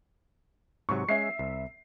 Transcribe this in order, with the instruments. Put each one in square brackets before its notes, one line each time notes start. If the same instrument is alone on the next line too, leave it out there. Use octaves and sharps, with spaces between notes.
[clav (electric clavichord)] G#2 C3 F#3 [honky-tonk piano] C#6
[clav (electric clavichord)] G#3 C#4 [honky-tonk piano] E5 C7
[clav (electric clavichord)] C2